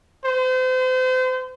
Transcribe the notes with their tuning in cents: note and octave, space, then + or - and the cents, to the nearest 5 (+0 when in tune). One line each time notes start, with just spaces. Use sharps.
C5 -35